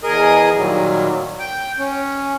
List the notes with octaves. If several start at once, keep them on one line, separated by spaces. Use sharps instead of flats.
E2 G#4 A#4 D#5 D#6
A#2 D#3 F#3 G3
G5
C#4